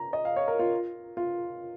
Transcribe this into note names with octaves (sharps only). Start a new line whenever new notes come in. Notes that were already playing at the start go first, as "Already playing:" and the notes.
Already playing: A#5
D#5
F5
C#5
A#4
F4
F4